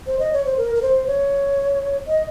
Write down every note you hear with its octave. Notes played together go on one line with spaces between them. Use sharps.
C5
D#5
C#5
C5
A#4
A#4
C5
C#5
D#5